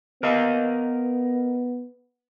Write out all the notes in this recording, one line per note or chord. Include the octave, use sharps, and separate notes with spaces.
B3 A#4 D#5 F5